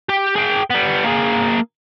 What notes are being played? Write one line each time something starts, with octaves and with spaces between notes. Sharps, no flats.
G4
G#4 G5
G3 B3
A#3 G#4